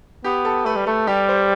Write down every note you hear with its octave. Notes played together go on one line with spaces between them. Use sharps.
B3 G4
A4
A3 B4
G3
A3 A4
G3 G4
C5